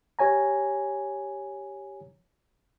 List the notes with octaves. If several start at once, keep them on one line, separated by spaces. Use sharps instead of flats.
G4 C#5 G#5 A#5